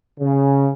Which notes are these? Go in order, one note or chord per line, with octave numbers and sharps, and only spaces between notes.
C#3